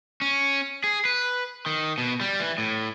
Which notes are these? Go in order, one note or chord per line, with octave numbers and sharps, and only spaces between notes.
C#4
G#4
B4
D#3
B2
G3
E3
A2